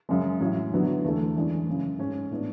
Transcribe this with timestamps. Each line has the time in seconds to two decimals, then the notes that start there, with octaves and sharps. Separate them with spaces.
0.09 F#2 C#3 G#3
0.40 A2 F#3 C#4 E4
0.73 D3 F#3 B3 E4
1.04 E2 D3 A3 E4
1.36 F#2 E3 G#3 D4
1.67 F#2 C#3 G#3
1.98 G#2 G#3 C#4
2.31 A2 G#3 B3 D4